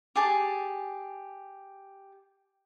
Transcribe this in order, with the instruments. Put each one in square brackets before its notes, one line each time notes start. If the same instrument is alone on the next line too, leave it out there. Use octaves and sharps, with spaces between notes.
[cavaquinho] G4 G#4 A5